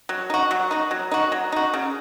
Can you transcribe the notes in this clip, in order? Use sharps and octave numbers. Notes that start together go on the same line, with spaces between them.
F#3
D#4 F#4
F#3
D#4 F#4
F#3
D#4 F#4
F#3
D#4 F#4
C#3